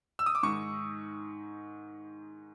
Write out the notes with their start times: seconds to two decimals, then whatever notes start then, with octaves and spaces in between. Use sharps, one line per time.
0.19 E6
0.26 D#6
0.35 D6
0.43 G#2 D#3 C#6